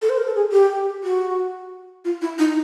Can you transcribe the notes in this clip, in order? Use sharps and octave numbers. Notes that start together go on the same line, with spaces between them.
A4
C5
A#4
A4
G#4
G4
F#4
F4
E4
D#4